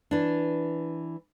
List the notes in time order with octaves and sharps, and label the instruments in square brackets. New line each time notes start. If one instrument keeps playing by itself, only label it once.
[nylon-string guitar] E3 D4